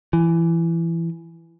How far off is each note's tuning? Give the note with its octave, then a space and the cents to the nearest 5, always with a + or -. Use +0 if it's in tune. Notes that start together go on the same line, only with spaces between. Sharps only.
E3 +20